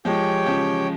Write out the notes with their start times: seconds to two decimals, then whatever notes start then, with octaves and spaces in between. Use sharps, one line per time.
0.05 F3 G#3 G4 C#5 G5
0.46 C#3 F3